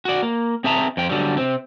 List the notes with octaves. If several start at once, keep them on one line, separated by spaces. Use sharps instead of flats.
F#4 D5
A#3
C4 G#4 E5 A5 A#5
F2 G5
D3 F#3 G3
C3 C4